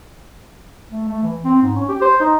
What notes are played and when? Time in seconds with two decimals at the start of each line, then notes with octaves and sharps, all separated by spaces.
0.91 A3
1.08 A3
1.23 E3
1.45 C4
1.62 G#2
1.75 C#4
1.89 G4
2.02 C5
2.20 D#4